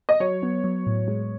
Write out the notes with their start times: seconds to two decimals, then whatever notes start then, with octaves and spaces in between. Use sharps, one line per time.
0.09 D#5
0.20 F#3 C#5
0.43 B3
0.64 F#3
0.86 A2
1.08 G#3